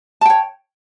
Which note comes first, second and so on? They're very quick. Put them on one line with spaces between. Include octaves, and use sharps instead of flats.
A5 G5 C#5